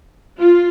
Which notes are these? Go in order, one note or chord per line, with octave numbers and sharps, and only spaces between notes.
F4